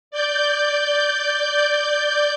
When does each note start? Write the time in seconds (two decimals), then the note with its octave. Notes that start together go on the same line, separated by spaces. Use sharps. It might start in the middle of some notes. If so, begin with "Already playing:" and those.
0.11 D5 G6